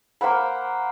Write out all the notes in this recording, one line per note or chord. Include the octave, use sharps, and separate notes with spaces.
A#3 C5 F#5 B5